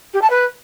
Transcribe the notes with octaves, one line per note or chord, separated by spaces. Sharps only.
G4
A5
B4